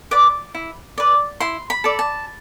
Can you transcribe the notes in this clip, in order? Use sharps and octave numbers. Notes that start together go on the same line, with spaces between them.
B4 D5 D6
E4
B4 D5
E4 C6
B5
A4 D5
A5